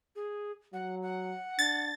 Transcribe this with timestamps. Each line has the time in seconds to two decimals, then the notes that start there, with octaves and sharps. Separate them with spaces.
0.16 G#4
0.73 F#3 F#5
1.02 F#5
1.59 D4 A6